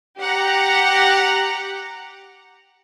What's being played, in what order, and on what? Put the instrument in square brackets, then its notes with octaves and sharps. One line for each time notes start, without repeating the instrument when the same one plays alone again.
[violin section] G4 F#5 A#5